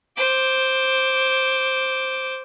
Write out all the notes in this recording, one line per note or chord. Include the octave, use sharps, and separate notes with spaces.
C5 D6